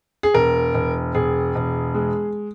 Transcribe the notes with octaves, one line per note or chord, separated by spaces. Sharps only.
G#4
E1 A#4
E1
E1 G#4
E1
G#3